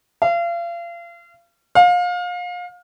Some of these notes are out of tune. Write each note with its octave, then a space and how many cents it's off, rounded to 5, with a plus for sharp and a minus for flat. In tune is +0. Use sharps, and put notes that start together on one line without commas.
F5 -35
F5 +30